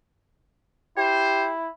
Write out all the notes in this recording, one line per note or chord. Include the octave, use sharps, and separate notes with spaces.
E4 G4 C5